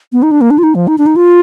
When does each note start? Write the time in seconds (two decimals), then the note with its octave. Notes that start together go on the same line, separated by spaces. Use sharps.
0.13 B3
0.23 D#4
0.31 D4
0.41 A#3
0.51 D4
0.58 F4
0.63 D#4
0.75 F3
0.88 D#4
0.98 D4
1.06 D#4
1.16 F4